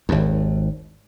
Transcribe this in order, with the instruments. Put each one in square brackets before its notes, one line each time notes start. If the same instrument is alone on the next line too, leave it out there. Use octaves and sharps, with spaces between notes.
[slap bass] G#1 D#2